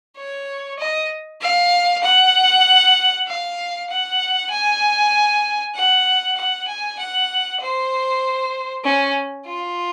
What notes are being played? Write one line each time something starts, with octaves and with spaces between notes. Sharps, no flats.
C#5
D#5
F5
F#5
F5
F#5
G#5
F#5
F#5
G#5
F#5
C5
C#4
F4